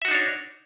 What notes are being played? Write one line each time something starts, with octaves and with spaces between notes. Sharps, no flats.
D4 D#4 F#4 C#5 E5